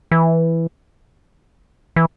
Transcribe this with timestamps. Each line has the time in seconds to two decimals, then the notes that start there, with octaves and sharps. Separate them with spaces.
0.12 E3
1.96 E3